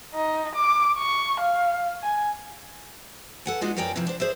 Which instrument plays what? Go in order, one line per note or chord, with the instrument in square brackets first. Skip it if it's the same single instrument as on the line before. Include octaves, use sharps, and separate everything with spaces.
[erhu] D#4
D6
C#6
F5
G#5
[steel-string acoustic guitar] A4 F#5 G#5
G#3 D4 D#4 F4 F#4 D#5
F#2 F3 A#4 D5 G5 G#5
C3 E3 F3
D4 C5
G#4 C5 D5 E5